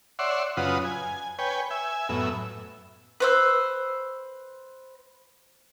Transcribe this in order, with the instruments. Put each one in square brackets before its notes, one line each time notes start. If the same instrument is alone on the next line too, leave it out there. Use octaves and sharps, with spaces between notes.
[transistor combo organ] C#5 D5 E5 F#5 C6
F#2 C#3 F4 B4 F#5 D#6
G#5
B4 C#5 G5 G#5
E5 G#5
F#2 A2 B3 E5
[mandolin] B4 C5 E6